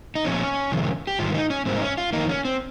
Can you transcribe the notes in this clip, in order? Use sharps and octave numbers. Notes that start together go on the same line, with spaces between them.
D#4
A#2 F3 C4 C#4
F2 C3 D#3 G#3
G4
G#2 D#3 G3 F4
D#4
C#4
G#2 G3 A#3 C4
D#4
C#4
F4
F2 D#3 A#3 D#4
C#4
C4